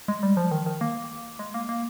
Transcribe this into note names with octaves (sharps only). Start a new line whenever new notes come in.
G#3
G3
F3
D#3
D#3
A#3
G#3
A#3
A#3